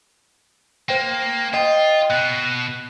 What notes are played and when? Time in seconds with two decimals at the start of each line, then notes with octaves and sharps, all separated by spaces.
0.89 A#3 C5 G5
1.54 F4 D#5 G5
2.10 B2 F#6